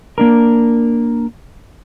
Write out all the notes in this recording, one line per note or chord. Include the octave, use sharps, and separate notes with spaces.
A#3 D4 A#4